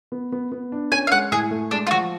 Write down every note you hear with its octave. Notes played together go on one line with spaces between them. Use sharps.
B3
B3
B3
D4
C#4 G#5
F5
G#3 F#5
A2 G#4
A3
G#3 D4
F4
F3 F#4